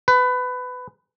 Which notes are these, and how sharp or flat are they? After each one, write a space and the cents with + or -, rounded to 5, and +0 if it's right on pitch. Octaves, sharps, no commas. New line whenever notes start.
B4 +20